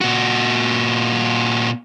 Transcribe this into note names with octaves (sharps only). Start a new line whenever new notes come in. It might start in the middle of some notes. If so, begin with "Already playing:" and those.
A#2 F#4